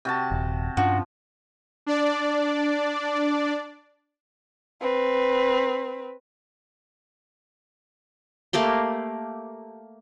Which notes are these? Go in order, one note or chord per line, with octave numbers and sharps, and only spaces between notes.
C3 F#4 A5
D#1
G2 F3 C#4 D4 F#4
D4 D5
C4 B4
A3 A#3 G4 C6